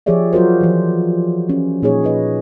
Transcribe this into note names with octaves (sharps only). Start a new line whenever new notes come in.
F3 G4 G#4 C#5 D5 E5
F#3 F4 F#4 A#4 C5
E3 F3
C#4
A#2 D#4 G#4 C#5
D#4 B4 D#5